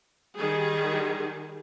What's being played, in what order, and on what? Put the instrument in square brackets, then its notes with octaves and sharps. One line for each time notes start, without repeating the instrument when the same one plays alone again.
[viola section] D#3 G3 G#4